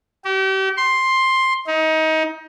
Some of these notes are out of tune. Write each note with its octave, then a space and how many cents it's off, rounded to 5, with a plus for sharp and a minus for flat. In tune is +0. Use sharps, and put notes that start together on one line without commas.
G4 -35
C6 +10
D#4 +25